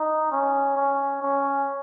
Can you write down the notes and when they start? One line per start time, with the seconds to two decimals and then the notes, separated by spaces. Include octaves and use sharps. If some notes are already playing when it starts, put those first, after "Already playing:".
Already playing: D#4
0.31 C#4
0.76 C#4
1.22 C#4